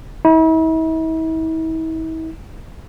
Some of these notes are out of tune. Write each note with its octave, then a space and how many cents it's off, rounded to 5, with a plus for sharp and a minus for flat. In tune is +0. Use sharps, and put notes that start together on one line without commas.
E4 -45